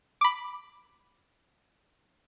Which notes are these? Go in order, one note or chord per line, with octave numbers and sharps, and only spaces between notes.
B5 D6